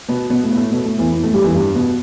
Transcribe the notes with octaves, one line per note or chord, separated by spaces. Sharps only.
B2 B3
B2 B3
A2 A3
B3
A2 A3
B2 B3
A2 A3
E2 E3
E2 E3
A2 A3
G2 G3
E2 E3
G2 G3
B2 B3